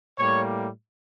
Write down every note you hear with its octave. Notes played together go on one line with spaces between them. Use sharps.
A2 G3 A#3 C#5